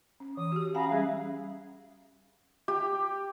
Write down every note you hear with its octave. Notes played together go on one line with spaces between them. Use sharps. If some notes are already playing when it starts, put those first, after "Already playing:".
C#4
E3 D#6
F#4 G4
C#4 F5 F#5 G#5 A#5 B5
G3 C#4 G#4 E5 F5
G4